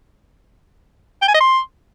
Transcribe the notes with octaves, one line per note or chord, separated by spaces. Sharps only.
G5
G#5
D#5
C6